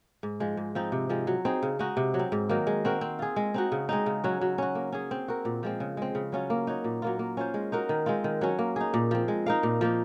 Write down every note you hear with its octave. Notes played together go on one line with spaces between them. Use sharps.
G#2
F3 G#3
G#2
F3 C4 D#4
C3
F3 G#3 C4
F#3
C4 D#4 G#4
C#3
G#3 D#4 F#4
C3
F#3
C4
G#2
D#3 F#3 A#3
G#3
C4 F#4 A#4
C4
F4 G#4
G#3
C4 D#4 F#4
C#3
G#3 C4 D#4
C#3
F#3 C#4 F#4
F#3
C#4 F#4
A#3
C#4 G#4
C4
F#4 A#4
A#2
F3 G#3 C4
C#3
G#3 C4
C#3
F#3 C#4 F4
A#3
D#4 F#4 C#5
A#2
F#3 A#3 F4
A#3
C#4 F4 C5
G#3
D#4 F#4 A#4
D#3
G#3 C4 F4
D#3
F#3 C#4
A#3
D#4 G#4
A#2
F3 C4
G#3
D#4 A#4 F5
A#2
F3 A#3 D#4